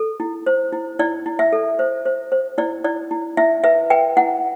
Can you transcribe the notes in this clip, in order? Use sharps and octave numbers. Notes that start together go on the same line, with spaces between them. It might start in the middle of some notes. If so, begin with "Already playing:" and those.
Already playing: A4
E4
C5
E4
E4 D5
E4
E5
A4
C5
C5
C5
E4 D5
E4 D5
E4
E4 E5
B4 E5
B4 G5
E4 F#5